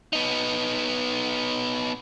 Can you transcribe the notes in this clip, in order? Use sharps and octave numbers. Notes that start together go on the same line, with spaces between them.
B3 D#4